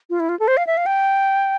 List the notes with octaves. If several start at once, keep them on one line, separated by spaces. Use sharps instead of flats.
F4
E4
F4
A4
C5
F5
E5
F5
G5